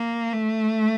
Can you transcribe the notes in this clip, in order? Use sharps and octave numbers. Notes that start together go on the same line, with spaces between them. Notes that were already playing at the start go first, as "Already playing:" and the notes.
Already playing: A#3
A3